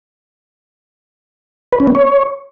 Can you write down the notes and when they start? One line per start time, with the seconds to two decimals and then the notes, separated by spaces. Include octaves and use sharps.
1.73 B4
1.80 C#4
1.87 B3
1.95 C#5